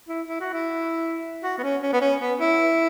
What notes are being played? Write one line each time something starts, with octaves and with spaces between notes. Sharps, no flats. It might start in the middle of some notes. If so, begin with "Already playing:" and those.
E4
E4
F#4
E4
F#4
B3
C#4
C#4
B3
C#4
B3
E4